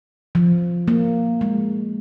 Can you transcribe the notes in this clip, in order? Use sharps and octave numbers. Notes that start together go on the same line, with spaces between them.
F3
A#3
G#3